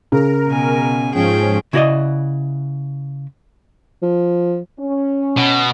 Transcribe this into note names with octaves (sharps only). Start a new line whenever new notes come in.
C#3 A#4
B2 G#5
G#2 F3 C#4 G#4 G5
C#3 E4 F#4 A4 D5 D#5
F3
C#4
B2